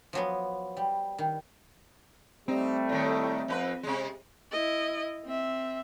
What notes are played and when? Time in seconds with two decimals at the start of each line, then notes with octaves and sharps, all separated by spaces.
0.13 F3 F#3 B3
0.77 G3
1.19 D#3
2.48 G3 A3 C4 D#4
2.89 A2 D#3
3.48 F2 C#4 B4
3.83 C3 G#3
4.51 E4 D#5
5.25 C4 E5